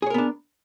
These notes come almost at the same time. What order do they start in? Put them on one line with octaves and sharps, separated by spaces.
G#4 C#5 A#4 B3 D4